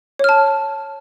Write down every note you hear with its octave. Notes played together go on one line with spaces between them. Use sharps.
C#5 A5 F6